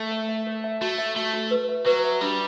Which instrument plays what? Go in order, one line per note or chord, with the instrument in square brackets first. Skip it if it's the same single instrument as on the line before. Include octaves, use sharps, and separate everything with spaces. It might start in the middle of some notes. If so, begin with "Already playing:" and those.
Already playing: [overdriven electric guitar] A3
[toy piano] E5
E5
A4
E5
[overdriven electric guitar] A3 [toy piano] F#4
[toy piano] E5
[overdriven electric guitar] A3 [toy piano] F#4
[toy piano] F#4
B4
E5
[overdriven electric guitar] F#3 [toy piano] B4
[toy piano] E5
[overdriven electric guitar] G3 [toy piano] D4